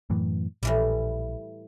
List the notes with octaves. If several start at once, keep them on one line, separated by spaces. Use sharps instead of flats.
F#2 A2 E3
A#1 A2 E3 G3